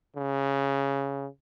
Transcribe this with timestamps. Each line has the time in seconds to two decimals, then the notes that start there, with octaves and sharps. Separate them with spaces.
0.16 C#3